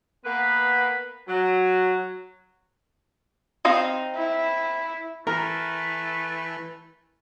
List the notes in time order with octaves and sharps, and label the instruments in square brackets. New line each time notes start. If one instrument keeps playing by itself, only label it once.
[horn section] A#3 B3 B4 F#5 B5
F#3
[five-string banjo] C4 D#4 F5
[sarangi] E4
[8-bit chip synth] E3 [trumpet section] A3 B4 [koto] A#4